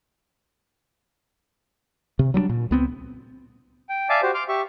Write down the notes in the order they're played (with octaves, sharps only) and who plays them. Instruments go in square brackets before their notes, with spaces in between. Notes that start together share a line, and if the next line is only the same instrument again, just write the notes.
[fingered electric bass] C3
F#3 G3 C4 D4
A#2
C#2 B3 C4
[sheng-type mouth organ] G5
D5 E5 F5 G#5 A5 D6
F#4 G4 C5
C6 D6 F6
G4 E5 C#6